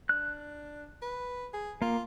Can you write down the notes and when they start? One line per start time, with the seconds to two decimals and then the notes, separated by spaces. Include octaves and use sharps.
0.09 D4 F#6
1.02 B4
1.53 G#4
1.82 A#3 F4